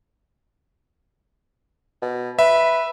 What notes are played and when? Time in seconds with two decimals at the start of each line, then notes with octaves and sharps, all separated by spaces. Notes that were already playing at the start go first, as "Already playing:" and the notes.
2.02 B2
2.39 B4 E5